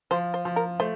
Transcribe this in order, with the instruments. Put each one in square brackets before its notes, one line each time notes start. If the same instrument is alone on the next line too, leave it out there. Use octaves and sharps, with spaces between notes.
[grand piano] F3 [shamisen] C5
[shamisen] C5
[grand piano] F3
[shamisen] A#4
[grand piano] A3 [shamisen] C5